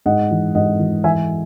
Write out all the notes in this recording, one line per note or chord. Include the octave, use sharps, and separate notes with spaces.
G#2 D#5 F#5
E3
G#2 D#5 F#5
E3
E3 E5 G#5